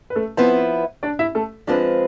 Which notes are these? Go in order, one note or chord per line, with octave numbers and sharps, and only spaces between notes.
B4
A3 A4
F3 B3 C4 E4 B4 C5
D4 D5
E4 E5
A3 A4
F3 G#3 C4 D4 F4 B4